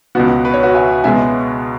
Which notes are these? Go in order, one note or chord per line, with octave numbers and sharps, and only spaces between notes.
C#2 B2 B3 F#4
B4
C#5
F#4 B4
E5 G#5
C#2 B2 G#3 B3 E5 G#5